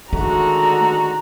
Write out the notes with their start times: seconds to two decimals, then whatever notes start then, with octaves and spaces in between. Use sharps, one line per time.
0.13 D3 D#3 G#3 A3 F#4 A#5